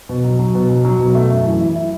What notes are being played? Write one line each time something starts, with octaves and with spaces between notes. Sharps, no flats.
B2
F#3
F#3
B2
F#3
F#3
B2
A3
F#2
E3
E4
E4